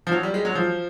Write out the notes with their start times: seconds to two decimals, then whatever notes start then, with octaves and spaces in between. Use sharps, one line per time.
0.07 F3
0.12 F#3
0.23 G3
0.34 G#3
0.45 F#3
0.55 F3